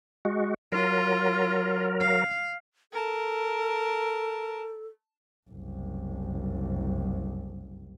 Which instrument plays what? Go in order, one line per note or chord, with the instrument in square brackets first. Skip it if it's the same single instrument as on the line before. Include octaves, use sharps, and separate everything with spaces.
[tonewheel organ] G#3 F#4
[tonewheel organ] F#3 A#4 [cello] F4
[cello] F5
[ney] A4 [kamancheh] A#4 A5
[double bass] F#1 C2